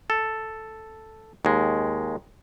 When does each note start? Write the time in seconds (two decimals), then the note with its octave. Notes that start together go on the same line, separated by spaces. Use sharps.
0.10 A4
1.45 D#2 G#3